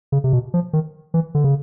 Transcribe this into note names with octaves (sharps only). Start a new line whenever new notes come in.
C#3
C3
B2
F3
D#3
E3
D3
C#3